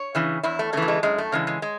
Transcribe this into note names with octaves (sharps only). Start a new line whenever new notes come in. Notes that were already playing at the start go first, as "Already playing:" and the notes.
Already playing: C#5
C#3 E3
E2 E4
A3
C#3 E3 A3
F#3
G#3
F#2 G#3
A3
C#3 E3 G#3
G#3
G#3